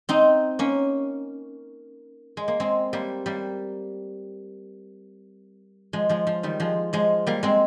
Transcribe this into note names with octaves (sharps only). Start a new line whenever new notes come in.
C4 D#4
A#3 C#4
G#3
A#3
G#3 C4
G3 A#3
G3 A#3
F3 G#3
F3 G#3
F3
D#3 G3
F3 G#3
F3 G#3
G3 A#3
G#3 C4